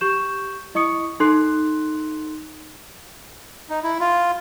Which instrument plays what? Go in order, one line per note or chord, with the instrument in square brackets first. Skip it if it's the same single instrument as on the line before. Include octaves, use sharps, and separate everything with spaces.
[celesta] G4 C#6 G6 E7
E4 D#5 C#6 D#6 C#7
D#4 A4 C6 F#6 C7
[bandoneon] D#4
E4
F4